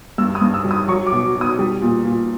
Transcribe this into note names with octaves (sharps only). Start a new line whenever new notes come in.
G2 E6
D#6
G2
E6
G3
D#6
F#3 C#6
D6
B2
B2
D#6
G3
A#2
A#2